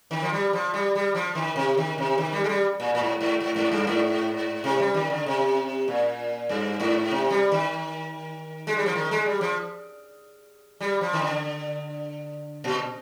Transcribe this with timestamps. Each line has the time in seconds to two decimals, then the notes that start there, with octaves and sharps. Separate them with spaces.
0.11 D#3
0.22 F3
0.33 G3
0.53 F3
0.74 G3
0.95 G3
1.15 F3
1.35 D#3
1.56 C3
1.77 D#3
1.98 C3
2.18 D#3
2.33 G3
2.44 G#3
2.49 G3
2.80 A#2
2.95 A#2
3.01 G#2
3.21 G#2
3.40 G#2
3.56 G#2
3.72 G2
3.87 G#2
4.64 C3
4.80 G3
4.94 D#3
5.10 D3
5.26 C3
5.88 A#2
6.49 G2
6.80 G#2
7.11 C3
7.30 G3
7.52 D#3
8.67 G#3
8.77 G3
8.86 F3
8.95 D#3
9.11 G#3
9.26 G3
9.41 F3
10.81 G3
11.01 F3
11.13 D#3
11.22 D3
12.64 A#2